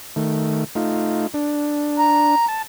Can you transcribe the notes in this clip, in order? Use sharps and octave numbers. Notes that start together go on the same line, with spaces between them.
D#3 A3
A3 D#4 F4
D4
A#5
A5